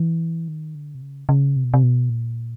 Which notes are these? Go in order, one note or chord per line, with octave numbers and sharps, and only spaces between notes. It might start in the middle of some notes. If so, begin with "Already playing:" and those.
Already playing: E3
D#3
D3
C3
C#3
C#3
C3
B2
C3
B2
A#2